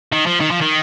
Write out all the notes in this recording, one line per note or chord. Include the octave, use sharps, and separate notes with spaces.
D#3
F3
D#3
F3
D#3